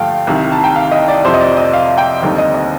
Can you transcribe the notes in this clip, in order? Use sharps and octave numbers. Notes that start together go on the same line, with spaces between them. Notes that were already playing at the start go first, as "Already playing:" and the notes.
Already playing: G2 D3 F3 A3 F5 G5 A5
C2 C3 D#3
A5
G5
F5
D#5
D5
F2 C3 F3 C5
D#5
D5
D#5
F5
G5
D#2 D3 G3 C4 D#4
D#5
D#5